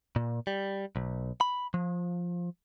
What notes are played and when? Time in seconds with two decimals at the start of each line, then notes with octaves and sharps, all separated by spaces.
0.16 A#2
0.47 G3
0.96 B1
1.41 B5
1.74 F3